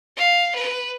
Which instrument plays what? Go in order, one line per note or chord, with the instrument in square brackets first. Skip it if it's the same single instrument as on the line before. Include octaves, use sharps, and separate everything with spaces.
[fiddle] F5
B4